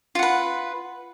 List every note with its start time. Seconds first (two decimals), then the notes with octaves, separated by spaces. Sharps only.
0.15 F4
0.19 F#5
0.23 B4